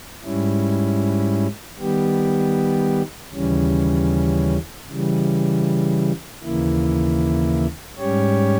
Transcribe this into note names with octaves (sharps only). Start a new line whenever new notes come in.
G#2 G3 C#4 E4
D#3 G3 B3 G4
D#2 C#3 E3 G3 C#4
C#3 E3 G3
D#2 C#3 E3 A#3 E4
G#2 G3 C#4 G4 C#5